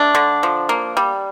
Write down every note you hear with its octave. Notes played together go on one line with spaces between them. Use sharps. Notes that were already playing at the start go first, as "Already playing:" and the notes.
Already playing: A3 D4
D3
F3
A#3
G3